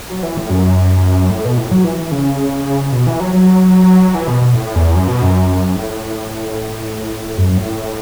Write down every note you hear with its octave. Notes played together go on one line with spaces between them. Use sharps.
F#3
E3
A2
F#2
A2
B2
A2
F#3
E3
E3
C#3
B2
E3
F#3
F#3
E3
B2
B2
A2
E2
F#2
B2
F#2
A2
F#2
A2